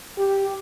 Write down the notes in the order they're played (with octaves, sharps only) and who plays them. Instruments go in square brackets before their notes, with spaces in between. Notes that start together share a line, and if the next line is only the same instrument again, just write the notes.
[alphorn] G4